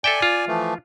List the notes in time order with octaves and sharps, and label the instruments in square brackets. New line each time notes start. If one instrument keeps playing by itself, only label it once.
[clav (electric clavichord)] A4 E5 G5 [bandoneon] D5 G#5
[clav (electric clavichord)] F4
[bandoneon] E3 F3 A3